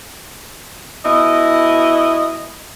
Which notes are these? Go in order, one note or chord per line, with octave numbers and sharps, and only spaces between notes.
B2 E4 D#5